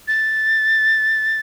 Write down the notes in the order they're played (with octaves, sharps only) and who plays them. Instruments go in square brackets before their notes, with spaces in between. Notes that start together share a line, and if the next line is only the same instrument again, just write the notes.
[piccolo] A6